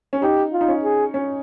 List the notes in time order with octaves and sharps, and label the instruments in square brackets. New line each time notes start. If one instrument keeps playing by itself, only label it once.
[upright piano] C#4
[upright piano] D#4 [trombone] G4
[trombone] F4
[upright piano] D#4
C#4
[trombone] G#4
[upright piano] C#4